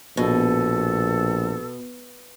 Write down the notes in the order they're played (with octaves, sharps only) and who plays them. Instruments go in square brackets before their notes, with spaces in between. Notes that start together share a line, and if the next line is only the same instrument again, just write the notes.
[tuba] A#1 [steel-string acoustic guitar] B2 [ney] A4